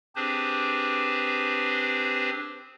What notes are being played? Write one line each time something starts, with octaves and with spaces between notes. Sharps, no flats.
C4 D4 G4 G#4 B4 C5